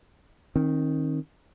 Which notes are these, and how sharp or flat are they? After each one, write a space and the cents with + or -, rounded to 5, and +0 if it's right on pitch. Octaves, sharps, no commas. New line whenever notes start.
D#3 +0 C4 +35